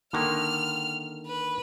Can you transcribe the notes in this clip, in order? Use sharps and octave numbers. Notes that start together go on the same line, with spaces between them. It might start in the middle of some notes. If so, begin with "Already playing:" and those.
D3 D#3 A#3 F6
B4